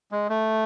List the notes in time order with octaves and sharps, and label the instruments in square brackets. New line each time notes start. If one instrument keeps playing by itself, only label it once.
[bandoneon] G#3
A3